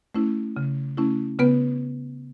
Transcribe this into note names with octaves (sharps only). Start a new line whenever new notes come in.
A3 C#4 E4
C#3
A3 C#4 E4
C#3 B3 B4